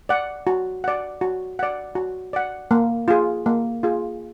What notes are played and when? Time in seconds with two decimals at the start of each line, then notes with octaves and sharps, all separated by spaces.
0.09 D5 F#5
0.47 F#4
0.84 D5 F#5
1.21 F#4
1.59 D5 F#5
1.95 F#4
2.33 D5 F#5
2.71 A#3
3.08 F4 G#4
3.46 A#3
3.83 F4 G#4